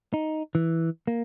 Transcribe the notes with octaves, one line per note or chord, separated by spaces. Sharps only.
D#4
E3
A#3